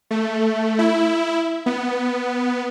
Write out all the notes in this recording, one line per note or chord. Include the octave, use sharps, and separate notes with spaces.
A3
E4
B3